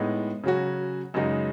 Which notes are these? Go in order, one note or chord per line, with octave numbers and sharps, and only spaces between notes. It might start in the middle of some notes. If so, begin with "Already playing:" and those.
Already playing: A2 G#3 B3 D#4
C#3 F#3 C#4 F#4
F#2 C#3 G#3 D#4 F#4